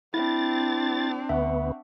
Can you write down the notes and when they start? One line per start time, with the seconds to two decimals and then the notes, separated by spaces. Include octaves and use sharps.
0.14 C4 D4 E4 A6
1.29 D2 B3 E5 F#5 C#6